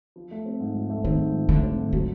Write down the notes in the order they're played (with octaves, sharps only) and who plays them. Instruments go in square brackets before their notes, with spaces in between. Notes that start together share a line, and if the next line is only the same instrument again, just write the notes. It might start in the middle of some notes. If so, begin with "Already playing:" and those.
[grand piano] F3
A3
C4
G#2
F3
A3
[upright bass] D#3 [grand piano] C4
[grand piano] G#2
F3
[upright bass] D3 [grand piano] A3
[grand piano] C4
G#2
[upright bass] D3 [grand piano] F#3